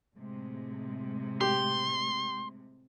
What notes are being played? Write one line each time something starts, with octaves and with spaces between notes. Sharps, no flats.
A2 C3 G#3
G4 C6